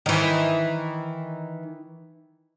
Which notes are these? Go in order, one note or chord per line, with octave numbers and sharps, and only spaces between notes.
D#3 E3